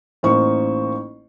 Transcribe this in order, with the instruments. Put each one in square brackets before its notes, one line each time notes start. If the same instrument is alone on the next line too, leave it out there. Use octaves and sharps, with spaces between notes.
[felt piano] A1 A#3 D#4 C5 C#6